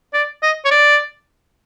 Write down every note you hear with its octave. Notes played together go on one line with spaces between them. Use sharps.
D5
D#5
C#5
D5